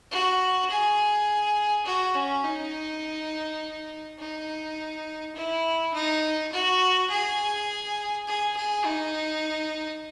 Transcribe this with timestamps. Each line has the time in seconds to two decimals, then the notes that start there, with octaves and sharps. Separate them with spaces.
0.11 F#4
0.70 G#4
1.86 F#4
2.15 C#4
2.44 D#4
4.19 D#4
5.35 E4
5.93 D#4
6.52 F#4
7.10 G#4
8.27 G#4
8.56 G#4
8.85 D#4